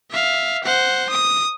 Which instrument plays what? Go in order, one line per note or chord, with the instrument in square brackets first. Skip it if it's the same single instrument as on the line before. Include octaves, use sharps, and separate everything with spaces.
[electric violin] E5 F5
C5 F#5
D#6